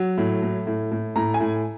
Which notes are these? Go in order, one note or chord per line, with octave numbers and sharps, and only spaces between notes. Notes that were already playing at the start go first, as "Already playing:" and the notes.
Already playing: F#3
A2
A2
A2
A2
A2 A#5
G#5
A2